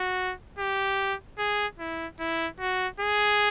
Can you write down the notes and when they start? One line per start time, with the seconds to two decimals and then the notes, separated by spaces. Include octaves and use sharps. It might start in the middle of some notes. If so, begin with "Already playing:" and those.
Already playing: F#4
0.59 G4
1.39 G#4
1.79 E4
2.20 E4
2.60 F#4
3.00 G#4